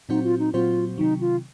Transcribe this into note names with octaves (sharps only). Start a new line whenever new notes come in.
A#2 F#3 C4 D#4 F#4 C5
F4
D#4
A#2 F#3 C4 F4 F#4 C5
C3 D#3 F#3 D#4
F4